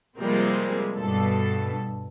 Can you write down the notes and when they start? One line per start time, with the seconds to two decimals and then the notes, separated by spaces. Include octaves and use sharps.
0.18 C3 F3 G3 G#3 A#3 C4
0.97 G2 B2 A4